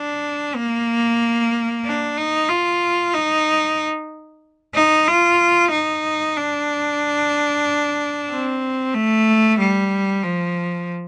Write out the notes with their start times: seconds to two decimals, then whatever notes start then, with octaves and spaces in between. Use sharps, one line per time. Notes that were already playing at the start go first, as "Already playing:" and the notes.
Already playing: D4
0.55 A#3
1.84 D4
2.17 D#4
2.49 F4
3.14 D#4
4.75 D#4
5.08 F4
5.71 D#4
6.37 D4
8.29 C4
8.94 A3
9.59 G3
10.24 F3